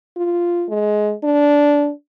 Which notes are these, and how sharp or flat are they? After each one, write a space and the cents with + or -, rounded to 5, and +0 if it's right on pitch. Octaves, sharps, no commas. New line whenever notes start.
F4 -5
G#3 +20
D4 -15